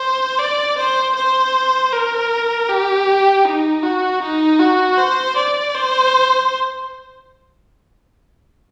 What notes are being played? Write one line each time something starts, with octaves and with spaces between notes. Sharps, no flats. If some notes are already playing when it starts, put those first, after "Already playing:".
Already playing: C5
D5
C5
C5
A#4
G4
D#4
F#4
D#4
F#4
C5
D5
C5